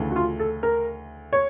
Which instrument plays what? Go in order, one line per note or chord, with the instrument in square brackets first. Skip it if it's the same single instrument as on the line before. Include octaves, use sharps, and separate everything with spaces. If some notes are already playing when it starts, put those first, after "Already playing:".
Already playing: [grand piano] D2 C#3 E3 A3
[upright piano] F#4
F4
A4
A#4
C#5